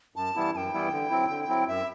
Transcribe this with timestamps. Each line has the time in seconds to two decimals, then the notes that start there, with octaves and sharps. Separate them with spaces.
0.16 F#2 A5
0.36 E3 G3 B3 E4
0.54 F#2 G5 A5
0.73 E3 G3 B3 E4
0.92 D3
1.10 F#3 C4 E4
1.29 D3
1.48 F#3 C4 E4
1.67 F#2 E5